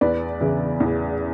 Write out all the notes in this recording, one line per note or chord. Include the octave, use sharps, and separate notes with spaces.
E2 B4 D5
C#3 E3
E2